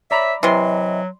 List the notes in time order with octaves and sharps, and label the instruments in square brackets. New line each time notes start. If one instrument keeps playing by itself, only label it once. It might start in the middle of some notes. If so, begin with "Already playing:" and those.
[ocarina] C#5 [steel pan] D5 A#5 B5 [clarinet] E5
[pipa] C3 E3 [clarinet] F#3 [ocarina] D#5 [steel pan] C6